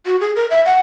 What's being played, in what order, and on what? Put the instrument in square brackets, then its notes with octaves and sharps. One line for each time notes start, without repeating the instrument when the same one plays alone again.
[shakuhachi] F#4
G#4
A#4
E5
F#5